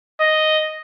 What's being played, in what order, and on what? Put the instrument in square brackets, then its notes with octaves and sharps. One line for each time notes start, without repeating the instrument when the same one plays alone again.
[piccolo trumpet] D#5